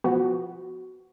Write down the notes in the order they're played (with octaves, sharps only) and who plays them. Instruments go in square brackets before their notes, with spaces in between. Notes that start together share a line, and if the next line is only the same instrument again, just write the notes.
[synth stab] B2 F3 B3 [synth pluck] F#4